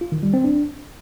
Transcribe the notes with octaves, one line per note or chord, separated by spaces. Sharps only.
F4
D#3
G3
C4
D4